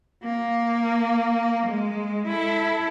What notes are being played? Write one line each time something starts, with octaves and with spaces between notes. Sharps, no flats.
A#3
G#3
E4 A4